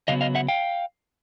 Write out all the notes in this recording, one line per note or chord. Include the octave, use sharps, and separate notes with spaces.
C#3 F#3 B3 D#5 F5
D#5 F5
E5 F#5
F5 G5